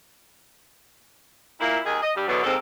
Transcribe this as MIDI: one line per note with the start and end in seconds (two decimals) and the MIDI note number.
1.60 1.79 46
1.60 1.79 58
1.60 1.79 64
1.85 1.99 39
1.85 1.99 51
1.85 1.99 68
2.02 2.11 75
2.16 2.28 43
2.16 2.28 55
2.28 2.43 40
2.28 2.43 47
2.28 2.43 50
2.28 2.43 54
2.28 2.43 59
2.44 2.56 39
2.44 2.56 44
2.44 2.56 58
2.44 2.56 60
2.44 2.56 69